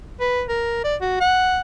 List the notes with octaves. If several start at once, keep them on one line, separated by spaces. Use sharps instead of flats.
B4
A#4
D5
F#4
F#5